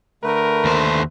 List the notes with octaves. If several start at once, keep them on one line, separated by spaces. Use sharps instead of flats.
D3 A3 A#4 B4
D#2 C5